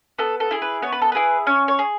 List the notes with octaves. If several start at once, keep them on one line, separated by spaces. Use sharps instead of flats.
B3 A4
A4
E4 G#4
B4
B3 C#5
B4
A4
E4 G#4 B4
C#4 C#5
C#5
G#4